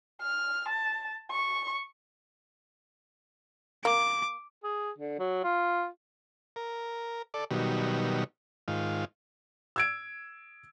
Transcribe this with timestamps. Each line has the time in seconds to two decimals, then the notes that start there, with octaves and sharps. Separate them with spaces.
0.21 F6
0.69 A5
1.31 C#6
3.85 A#3 D6
4.64 G#4
4.98 D3
5.19 F#3
5.44 F4
6.56 A#4
7.34 A4 D5
7.51 B2 D#3 F#3 G3
8.68 G#2 D#3 F4
9.76 E6 G#6 D7